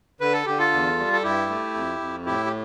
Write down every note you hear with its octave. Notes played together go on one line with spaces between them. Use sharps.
D3 B4
A4
D3 G4
F4 A4
E2
G3
A4
G2 E4 G4
A3
F2
F2
A2 E4 G4
G4